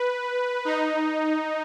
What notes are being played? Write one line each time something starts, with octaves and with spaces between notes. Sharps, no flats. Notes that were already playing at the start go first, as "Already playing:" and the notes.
Already playing: B4
D#4